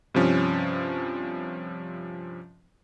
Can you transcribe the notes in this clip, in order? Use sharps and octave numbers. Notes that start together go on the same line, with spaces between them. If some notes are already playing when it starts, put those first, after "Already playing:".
G2 C3 F3 C#4